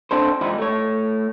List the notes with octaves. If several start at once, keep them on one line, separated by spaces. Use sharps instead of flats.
C4 D4 A4 C5
G#2 E3 F3 G3 D#4 E4
A3 C#5